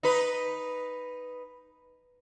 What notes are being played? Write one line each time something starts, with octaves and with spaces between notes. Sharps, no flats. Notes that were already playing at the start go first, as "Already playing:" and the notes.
D#4 B4